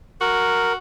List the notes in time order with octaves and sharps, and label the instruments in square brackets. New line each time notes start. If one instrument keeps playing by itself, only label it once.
[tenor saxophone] F#4 [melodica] A#4